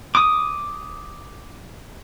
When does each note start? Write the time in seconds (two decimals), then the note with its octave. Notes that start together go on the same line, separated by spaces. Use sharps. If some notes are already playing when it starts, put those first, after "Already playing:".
0.15 D6 D#6